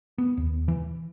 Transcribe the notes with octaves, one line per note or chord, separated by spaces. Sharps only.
B3
D#2
E3